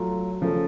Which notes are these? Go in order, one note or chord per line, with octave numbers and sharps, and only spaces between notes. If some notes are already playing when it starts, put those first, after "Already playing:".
Already playing: F#3 A3 F4
C#3 F3 A3